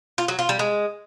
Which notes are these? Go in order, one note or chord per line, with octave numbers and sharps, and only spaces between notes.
F4
F#3
F4
G3
G#3